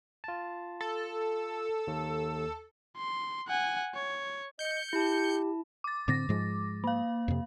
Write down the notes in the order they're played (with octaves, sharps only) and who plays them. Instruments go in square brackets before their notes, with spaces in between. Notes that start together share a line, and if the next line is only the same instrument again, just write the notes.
[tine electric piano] F4 A5
[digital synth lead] A4
[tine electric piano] D#2
[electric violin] C6
F#5 G#5
C#5
[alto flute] D#5 [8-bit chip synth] G6 C#7
[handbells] E4 A5 [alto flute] G4
[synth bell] D6 A6
[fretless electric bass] A2 D3 C4 [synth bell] D6 A6 A#6
[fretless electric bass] G#2 F3 G#3
[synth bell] A#3 F5
[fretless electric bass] F2 C3